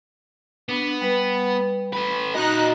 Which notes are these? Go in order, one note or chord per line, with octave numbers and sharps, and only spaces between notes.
B3 D4
G3 B4
A3 B4
A#2 D#4 F#4 D#5 F#6